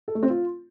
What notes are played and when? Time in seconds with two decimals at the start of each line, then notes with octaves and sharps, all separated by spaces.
0.08 A4
0.15 A3
0.23 C4
0.30 F4